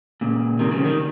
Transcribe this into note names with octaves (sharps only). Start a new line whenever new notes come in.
A#2 C#3
C3 D#3
C#3 F3
D#3 G3